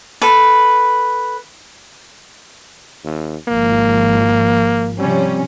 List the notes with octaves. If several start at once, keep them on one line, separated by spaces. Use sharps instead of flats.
A4 B4
D#2
G#1 F3 A#3
C3 F3 G3 C#4